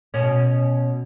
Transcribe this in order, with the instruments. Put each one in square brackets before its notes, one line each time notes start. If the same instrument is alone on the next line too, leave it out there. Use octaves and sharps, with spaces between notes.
[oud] B2 C#4